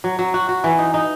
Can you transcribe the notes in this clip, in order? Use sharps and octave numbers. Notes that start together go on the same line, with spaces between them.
F#3
F#3
F#4
F#4
E3
D#4
D#4